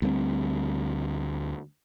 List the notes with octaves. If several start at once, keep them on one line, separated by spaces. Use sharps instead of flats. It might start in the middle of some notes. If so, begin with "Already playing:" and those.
D2 G3 A#3 C4